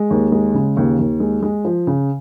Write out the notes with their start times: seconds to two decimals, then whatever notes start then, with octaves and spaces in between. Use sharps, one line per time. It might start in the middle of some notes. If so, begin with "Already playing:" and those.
Already playing: G#3
0.10 D#2
0.32 G#3
0.54 C#3
0.77 D#2
0.99 D#2
1.20 G#3
1.43 G#3
1.65 F3
1.87 C#3